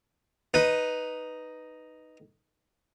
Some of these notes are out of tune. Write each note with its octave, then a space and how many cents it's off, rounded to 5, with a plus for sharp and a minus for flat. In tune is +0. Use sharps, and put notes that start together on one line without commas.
D#4 +0 B4 +0